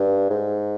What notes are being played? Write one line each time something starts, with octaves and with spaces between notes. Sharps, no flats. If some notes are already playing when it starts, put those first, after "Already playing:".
Already playing: G2
G#2